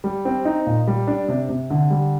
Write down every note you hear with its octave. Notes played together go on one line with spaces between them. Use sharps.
G3
C4
D#4
A#2
G3
D4
C3
C3
D3
G3